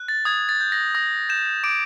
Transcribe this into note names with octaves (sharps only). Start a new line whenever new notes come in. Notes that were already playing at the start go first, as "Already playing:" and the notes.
Already playing: F#6
A6
D#6 G#6
A6
G6
A#6
D#6 A#6
G6 E7
D6 D7